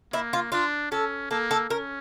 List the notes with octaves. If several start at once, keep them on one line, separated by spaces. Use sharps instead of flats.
A#3 E4
F4
D4 F4
C#4 A4
A#3 A4
A4
C#4 A#4